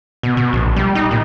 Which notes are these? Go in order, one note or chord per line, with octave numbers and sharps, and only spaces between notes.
B2
B2
A#1
G3
D#4
A#2